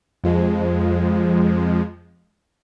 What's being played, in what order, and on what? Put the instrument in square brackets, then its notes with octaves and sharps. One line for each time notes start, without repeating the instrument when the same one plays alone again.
[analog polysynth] F2 F3 G#3